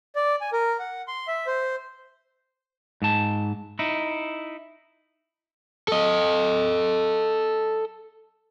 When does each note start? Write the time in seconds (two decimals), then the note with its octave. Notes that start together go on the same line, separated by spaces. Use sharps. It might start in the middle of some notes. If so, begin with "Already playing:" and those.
0.15 D5
0.41 G#5
0.53 A#4
0.79 F#5
1.08 C6
1.28 E5
1.47 C5
3.02 G#2 A5
3.79 D#4 E4
5.88 A4 D#5